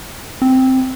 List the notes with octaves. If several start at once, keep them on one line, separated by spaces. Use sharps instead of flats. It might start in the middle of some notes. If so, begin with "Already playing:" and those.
C4